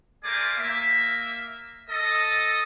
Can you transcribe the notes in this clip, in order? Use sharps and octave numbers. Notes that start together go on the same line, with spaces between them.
A3 G#4 A#4 C5 D5 D6
A#3 E5
A4 D#5